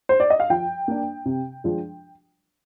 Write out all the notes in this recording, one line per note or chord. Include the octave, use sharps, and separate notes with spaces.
C5
D5
D#5
F5
F3 G5
A#3 D4
C3
F3 G#3 D4